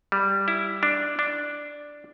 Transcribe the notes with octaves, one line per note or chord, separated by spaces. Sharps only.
G3
E4
D4
D4